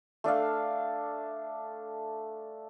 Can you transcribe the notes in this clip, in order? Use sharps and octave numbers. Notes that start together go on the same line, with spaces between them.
A3 D4 A4 F5